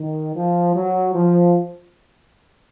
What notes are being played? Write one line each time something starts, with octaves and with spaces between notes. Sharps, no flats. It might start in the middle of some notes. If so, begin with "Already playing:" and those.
Already playing: D#3
F3
F#3
F3